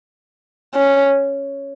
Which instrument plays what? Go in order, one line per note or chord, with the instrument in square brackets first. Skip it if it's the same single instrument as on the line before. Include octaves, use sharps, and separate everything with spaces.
[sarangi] C#4